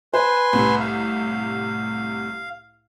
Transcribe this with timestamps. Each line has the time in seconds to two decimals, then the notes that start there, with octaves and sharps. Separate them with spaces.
0.14 B4 C5 G#5 C6
0.53 C2 A2 C3
0.80 F5